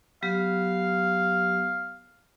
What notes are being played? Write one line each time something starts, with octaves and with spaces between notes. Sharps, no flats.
F#3 B3 G4 F5